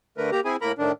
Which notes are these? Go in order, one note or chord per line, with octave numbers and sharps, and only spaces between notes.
D3 A3 A#4 B4
A#3 G4 A#5
C4 E4 G#4 G#5
A2 A#3 A#4 A#5 B5
A2 D#3 D4